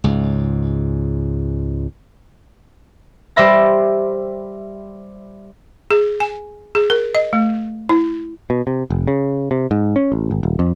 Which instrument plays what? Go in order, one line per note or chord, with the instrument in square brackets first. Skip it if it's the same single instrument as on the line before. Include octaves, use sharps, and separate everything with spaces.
[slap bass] C#2 G#2
[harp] G3 C5 D5 E5 B5 A#6
[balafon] G#4
G#5
G#4
A#4
D#5
A3
E4
[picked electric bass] B2
C3
F1
C#3
C3
G#2
C#4
A1
G#1
D#1
F2